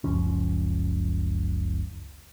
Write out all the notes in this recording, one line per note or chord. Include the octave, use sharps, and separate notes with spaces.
F#1 C#2 F3 C#4